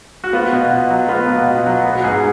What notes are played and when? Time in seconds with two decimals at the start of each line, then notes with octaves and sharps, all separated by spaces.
0.24 F#4
0.33 B3 F4
0.52 B2
0.71 B2
0.90 F#3
1.08 B3 F4
1.28 B2
1.47 B2
1.66 F#3
1.85 B3
1.93 F#4
2.04 G#2 G#4